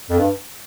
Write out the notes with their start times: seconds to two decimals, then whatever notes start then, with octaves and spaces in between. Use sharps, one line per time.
0.10 F2
0.19 G2